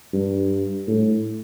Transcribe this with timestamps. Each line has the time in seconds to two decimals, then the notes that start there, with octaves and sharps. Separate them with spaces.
0.13 G2
0.87 A2